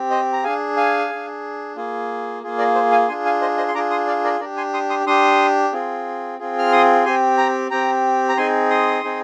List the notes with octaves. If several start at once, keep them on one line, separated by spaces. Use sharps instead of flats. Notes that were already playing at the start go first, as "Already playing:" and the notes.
Already playing: C4 G4
C5 D#5
A#5
D4 G#4 F5 G#5
F5 G#5
D4 G#4
A#3 F4 G#4
A#3 F4 G#4
A#4 D5
C5
F5 G#5
D4 F4 G#4 G#5 C6
F5 G#5
C5 D#5
C5 D#5
C6
D4 F4 G#4 A#5 D6
C6 D#6
D5 F5
A#4 D5
D4 G4 A#4 D5
G#5 C6
C6 D#6
C6 D#6
D4 G4 C6 D#6
C4 F4 G#4
C4 F4 G#4
F6
C6 D#6
C4 G4 G#5 C6
G5 A#5
C4 G4 G5 A#5
A#5
C4 D#4 G#4 G#5 C6
C6 D#6
C4 D#4 G#4